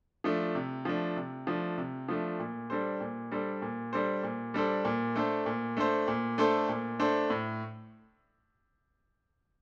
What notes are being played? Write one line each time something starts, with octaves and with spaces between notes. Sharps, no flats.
F3 A3 D4
C3
F3 A3 D4
C3
F3 A3 D4
C3
F3 A3 D4
A#2
G3 D4 A4 C5
A#2
G3 D4 A4 C5
A#2
G3 D4 A4 C5
A#2
G3 D4 A4 C5
A#2
A3 D4 A4 C5
A#2
A3 D4 A4 C5
A#2
A3 D4 A4 C5
A#2
A3 D4 A4 C5
A2